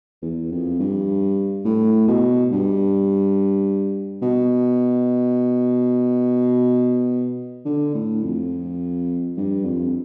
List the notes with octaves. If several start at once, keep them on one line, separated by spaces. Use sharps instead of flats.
E2
F2
G2
A2
B2
G2
B2
D3
A2
F2
G2
F2